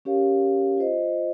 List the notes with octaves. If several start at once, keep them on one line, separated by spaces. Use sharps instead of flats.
C#4 G4 A#4 C#5 F5
F4 C5 D#5